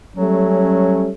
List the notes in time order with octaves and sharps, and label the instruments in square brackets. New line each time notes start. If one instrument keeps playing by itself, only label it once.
[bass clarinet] F#3 [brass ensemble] G3 A3 C#4